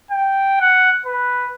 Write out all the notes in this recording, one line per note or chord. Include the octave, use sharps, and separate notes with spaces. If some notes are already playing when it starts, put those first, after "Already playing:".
G5
F#5
B4